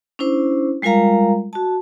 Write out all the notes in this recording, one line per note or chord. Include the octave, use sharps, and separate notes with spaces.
C#4 D4 E4 C5
G3 G#3 F4 A#4 F5 A#5
F#4 A5